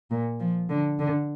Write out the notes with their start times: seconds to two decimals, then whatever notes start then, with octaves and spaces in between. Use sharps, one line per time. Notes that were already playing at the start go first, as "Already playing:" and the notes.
0.11 A#2
0.40 F3
0.69 D3
0.99 D3